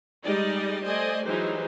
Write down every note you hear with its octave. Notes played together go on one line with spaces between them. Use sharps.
G3 G#3 D#4 G4 D5 D#5
A3 C5 D5 D#5 G#5
E3 F#3 G#3 D#4 G4 C5